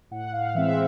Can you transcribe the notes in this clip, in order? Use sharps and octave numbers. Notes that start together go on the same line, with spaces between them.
A2 F#5
F5
E3 G#3 C4 E5